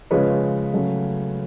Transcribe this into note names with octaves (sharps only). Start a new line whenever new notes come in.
C#3 F3 G#3 B4 C#5
C#3 F#3 A3